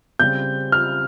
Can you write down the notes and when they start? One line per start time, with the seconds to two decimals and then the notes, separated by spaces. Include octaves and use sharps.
0.20 C#3 G3 C4 G6
0.72 F6